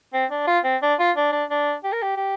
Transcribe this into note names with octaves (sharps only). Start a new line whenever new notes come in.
C4
D4
F4
C4
D4
F4
D4
D4
D4
G4
A#4
G4
G4